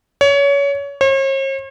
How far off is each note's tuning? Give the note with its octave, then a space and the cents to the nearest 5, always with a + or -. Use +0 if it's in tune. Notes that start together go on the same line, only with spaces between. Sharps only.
C#5 +25
C#5 -45